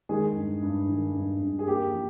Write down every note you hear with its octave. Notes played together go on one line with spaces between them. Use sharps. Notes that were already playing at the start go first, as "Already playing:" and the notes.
D#3 G#3 G#4
G2
G2
D#3
G2
G2
G#4
A#3 G4
F3